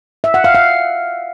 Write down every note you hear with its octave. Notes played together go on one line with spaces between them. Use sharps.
E5
F#5
F5
F5